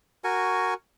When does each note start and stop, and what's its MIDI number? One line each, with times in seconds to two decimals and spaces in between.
0.24 0.74 66
0.24 0.74 70
0.24 0.74 80
0.24 0.74 85